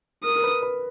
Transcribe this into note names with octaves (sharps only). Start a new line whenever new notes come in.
A#4 D#6
A#4
B4
B4